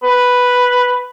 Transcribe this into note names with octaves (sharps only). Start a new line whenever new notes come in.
B4